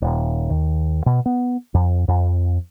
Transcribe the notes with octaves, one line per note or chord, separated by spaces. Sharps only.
D#1
D#2
B2
B3
F2
F2